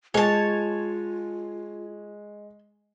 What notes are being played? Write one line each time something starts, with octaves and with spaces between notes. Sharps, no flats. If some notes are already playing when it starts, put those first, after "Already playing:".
G#3 F4 C#5 G#5 A5